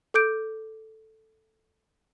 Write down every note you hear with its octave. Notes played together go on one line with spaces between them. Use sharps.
A4 D6 G6 D7